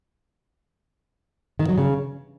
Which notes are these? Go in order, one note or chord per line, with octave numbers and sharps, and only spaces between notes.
D#3
F#3
C#3